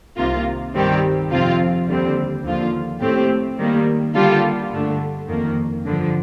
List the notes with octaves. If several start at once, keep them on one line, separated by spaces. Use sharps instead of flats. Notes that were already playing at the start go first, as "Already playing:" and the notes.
C2 C3 D#3 A#3 F4
G2 D#3 G3 C4 G4
F2 C3 F3 C4 F4
D#2 D3 G3 C4
D#2 D3 F3 A#3 F4
A2 A3 C4 G4
D#3 G3 A#3
D3 G3 A#3 F4 A4
G2 D3 A3 D4
F2 D#3 A#3
G2 D3 F3